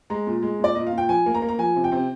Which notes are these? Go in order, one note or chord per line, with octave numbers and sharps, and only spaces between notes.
G#3 A#5
A#2
G#3
A#2 D5
A#2 D#5
F5
A#2 G5
F3 G#5
A#3
A#5
A#3
A#5
F3 G#5
C3
G5
C3